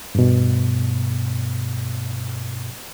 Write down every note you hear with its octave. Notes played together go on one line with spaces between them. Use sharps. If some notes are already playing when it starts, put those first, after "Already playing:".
G2 B2